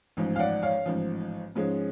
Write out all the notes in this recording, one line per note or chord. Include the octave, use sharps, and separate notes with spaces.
A1 G#2 F3
F5
D5 F#5
C#5 F5
A1 G#2 F3
G#2 F3 G#3 C#4